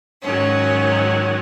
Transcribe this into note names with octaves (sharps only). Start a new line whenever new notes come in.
G#2 D#3 F#3 C#4